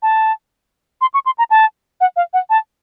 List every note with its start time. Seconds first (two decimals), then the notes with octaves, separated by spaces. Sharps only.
0.02 A5
1.01 C6
1.14 C#6
1.26 C6
1.38 A#5
1.50 A5
2.01 F#5
2.16 F5
2.33 F#5
2.50 A5